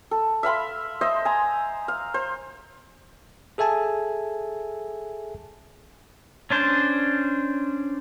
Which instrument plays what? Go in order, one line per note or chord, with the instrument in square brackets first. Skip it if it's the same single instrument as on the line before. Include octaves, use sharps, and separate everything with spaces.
[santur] A4
E5 F5 B5 C6
C5 D#5 E5
G#5 A#5
F5
C5
[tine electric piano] G#4 A4 E5 G#5 A5
[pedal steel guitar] C#4 D4 C5